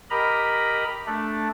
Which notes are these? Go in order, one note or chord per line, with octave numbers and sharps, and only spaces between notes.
G4 A#4 D#5 A#5 B5
A3 D4